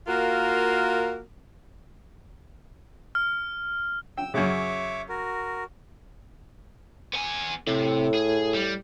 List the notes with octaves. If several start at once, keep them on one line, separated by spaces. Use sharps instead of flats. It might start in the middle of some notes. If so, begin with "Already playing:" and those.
A#3 F4 F#4 A#4
F6
G5 E6
F#2 C#3 C#5 E5 D6
F#4 A#4
B3 G#5
A2 C3
G#4
G3